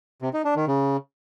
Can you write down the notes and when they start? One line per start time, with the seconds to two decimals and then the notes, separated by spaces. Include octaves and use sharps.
0.22 C3
0.33 D#4
0.45 D4
0.56 D#3
0.68 C#3